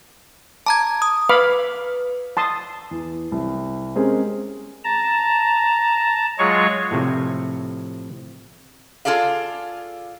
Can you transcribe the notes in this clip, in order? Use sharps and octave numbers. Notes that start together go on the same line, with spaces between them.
A5 A#5 D6 G#6
D#6
B4 F5 B5 D6
A5 C6 D#6
E2
C2
G#3 C4 C#4 G4 G#4 A#4
A5 A#5
F#3 G#3 F4 G#4 C#5 C#6
A2 C3 F3
F4 G#4 A4 D5 F5